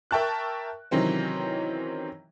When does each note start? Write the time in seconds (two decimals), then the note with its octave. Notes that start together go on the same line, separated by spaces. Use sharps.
0.11 A#4 E5 G5 A5 C#6 F#6
0.91 C3 D#3 E3 F#3 C4 C#4